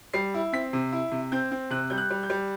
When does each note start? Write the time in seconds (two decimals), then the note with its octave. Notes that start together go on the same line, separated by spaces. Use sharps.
0.14 G3 C7
0.34 E4
0.53 C4 B6
0.73 C3
0.92 E4
1.12 C3
1.32 C4 G6
1.51 C4
1.70 C3 F#6
1.90 G3 G6
1.98 F#6
2.10 G3
2.23 G6
2.30 G3